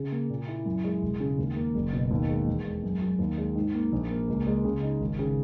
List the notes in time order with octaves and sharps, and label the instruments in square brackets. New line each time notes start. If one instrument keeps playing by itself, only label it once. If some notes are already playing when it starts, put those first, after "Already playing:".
Already playing: [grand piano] C#3
A#3
A#2
E4
F#2
G#3
E1
C#3
D#2
A#3
F#1
B2
D#2
G#3
E2
G#3
F#2
F#3
D#2
G#3
G#2
A#3
A#1
A#3
C#2
G#3
C#3
D#4
G#1
C#3